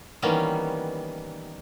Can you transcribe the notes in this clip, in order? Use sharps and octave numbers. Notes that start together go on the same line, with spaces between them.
D#3 E3 G3 A#3 B3 C#4